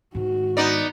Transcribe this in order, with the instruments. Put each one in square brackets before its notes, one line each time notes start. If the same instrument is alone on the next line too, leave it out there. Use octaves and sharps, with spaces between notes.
[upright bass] G#2 D#3 [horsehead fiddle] F#4
[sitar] B3 D#4 D5